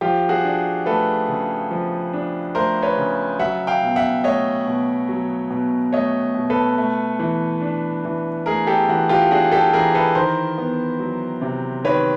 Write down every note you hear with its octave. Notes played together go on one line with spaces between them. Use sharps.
F3 F4 G4
F#4 G#4
D4
A3 A4 B4
C#3
F3
D4
A3 A#4 C5
B4 C#5
C#3
F#3 E5 F#5
F5 G5
B2
E5 F#5
A3 C#5 D#5
B2
F#3
B2
A3 C#5 D#5
B2
A4 B4
A3
E3
D4
E3
A3 G#4 A#4
G4 A4
E3 F#4
F4 G4
D4 F#4 G#4
G4 A4
E3 G#4 A#4
A4 B4
D#3 A#4 C5
B3
F#3
C3
D#3 B4 C#5